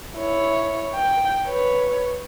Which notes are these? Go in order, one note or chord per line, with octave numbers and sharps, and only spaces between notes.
E4 C#5
G5
B4 C#5